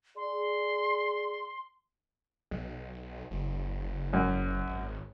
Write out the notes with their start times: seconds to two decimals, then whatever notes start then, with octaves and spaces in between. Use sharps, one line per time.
0.17 G#4 D5 C6
2.51 B1
3.31 F#1
4.13 F#2
4.66 G#1